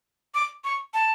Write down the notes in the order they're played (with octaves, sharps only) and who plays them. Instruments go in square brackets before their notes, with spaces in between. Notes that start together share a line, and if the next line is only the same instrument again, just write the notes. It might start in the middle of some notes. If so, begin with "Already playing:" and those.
[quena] D6
C#6
A5